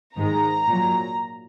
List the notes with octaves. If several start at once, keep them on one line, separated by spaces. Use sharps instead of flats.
G#2 D#3 G#3 A#5
A#2 F#3